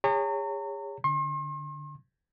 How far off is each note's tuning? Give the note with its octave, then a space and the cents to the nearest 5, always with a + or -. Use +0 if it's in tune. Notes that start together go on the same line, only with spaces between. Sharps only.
G#4 -40 C#5 +0 A#5 -40
D3 +0 C6 +40